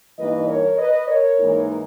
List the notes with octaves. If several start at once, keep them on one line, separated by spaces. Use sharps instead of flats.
G2 E3 A#3 D#4 B4 D#5
A#4 C#5
B4 D#5
A#4 C#5
G#2 E3 A#3 D#4